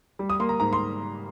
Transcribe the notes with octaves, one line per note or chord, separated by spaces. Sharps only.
G3
D#6
A#3 C6
A#5
G#2 A#5
C6